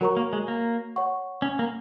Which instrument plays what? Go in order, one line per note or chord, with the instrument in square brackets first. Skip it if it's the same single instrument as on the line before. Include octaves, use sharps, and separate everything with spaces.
[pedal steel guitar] F#3 [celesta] F#4 A#4 C#5 A#5 C#6
[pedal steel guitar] A#3
G#3
A#3
[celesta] C#5 F#5 C#6
[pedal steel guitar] C#4
A#3